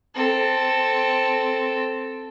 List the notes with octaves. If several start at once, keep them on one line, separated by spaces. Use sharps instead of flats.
C4 A4